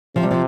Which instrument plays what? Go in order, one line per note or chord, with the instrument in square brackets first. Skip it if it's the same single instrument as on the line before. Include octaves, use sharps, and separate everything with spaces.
[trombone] C3 [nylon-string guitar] F3
[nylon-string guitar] G3
F3